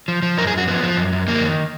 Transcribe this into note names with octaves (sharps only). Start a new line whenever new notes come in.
F3
F3
F#2 A#4
G#4
F#2 F#4
F3 B3
F3
F#2
F#2
F2 A#3
D#3